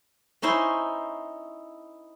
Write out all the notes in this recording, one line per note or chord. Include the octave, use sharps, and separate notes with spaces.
C#4 D#4 E4 C5